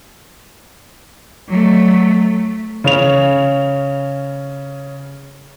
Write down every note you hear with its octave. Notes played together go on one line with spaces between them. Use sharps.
F#3 A3
C#3 C#4 F7